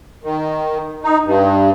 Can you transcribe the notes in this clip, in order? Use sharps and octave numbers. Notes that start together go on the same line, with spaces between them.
D#3
D#4
G2